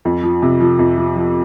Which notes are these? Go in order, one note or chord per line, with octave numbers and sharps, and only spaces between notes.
F2
F3
C3
F3
F2
F3
F3